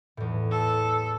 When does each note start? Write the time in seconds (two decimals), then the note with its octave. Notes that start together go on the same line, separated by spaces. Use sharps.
0.17 E2 A2
0.52 A4